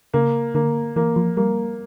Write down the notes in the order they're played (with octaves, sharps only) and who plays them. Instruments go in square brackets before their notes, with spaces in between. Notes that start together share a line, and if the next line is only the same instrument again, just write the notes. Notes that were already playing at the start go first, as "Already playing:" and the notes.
[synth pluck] C#3 [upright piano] A#3
[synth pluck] D3 [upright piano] A#3
[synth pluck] E3 [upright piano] A#3
[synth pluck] F3
[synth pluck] G3 [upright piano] A#3